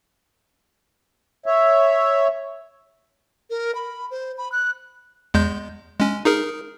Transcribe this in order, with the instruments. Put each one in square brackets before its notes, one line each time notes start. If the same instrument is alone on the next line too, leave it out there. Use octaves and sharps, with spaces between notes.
[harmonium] C#5 E5
[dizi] A#4
B5
C5
B5
F#6
[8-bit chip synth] E2 G#3 G6
G#3 C#4
D#4 G#4 A#4